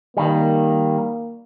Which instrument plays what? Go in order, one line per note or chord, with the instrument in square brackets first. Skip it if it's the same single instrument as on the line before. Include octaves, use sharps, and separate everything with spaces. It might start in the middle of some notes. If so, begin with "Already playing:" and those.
[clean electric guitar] D#3 G3 [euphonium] A#3